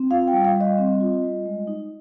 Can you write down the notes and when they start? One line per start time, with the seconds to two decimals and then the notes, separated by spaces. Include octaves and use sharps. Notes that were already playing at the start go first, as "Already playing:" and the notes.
Already playing: C4
0.10 F4 F5
0.28 G3 G5
0.45 F5
0.56 G3 D#5
0.78 C4
1.01 F4
1.22 G3
1.46 G#3
1.67 D#4